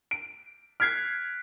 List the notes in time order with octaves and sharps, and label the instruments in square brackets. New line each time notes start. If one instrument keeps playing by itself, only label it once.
[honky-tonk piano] D7
[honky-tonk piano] F6 G#6 C7 [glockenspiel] F#6 B6 D7